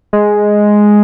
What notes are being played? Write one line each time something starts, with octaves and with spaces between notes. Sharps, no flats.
G#3